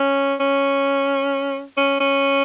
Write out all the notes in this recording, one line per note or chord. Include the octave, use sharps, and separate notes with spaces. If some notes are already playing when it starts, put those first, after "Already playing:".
Already playing: C#4
C#4
C#4
C#4